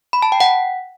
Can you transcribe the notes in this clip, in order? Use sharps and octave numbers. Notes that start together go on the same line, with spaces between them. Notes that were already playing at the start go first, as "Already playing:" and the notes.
B5
A5
G5
F#5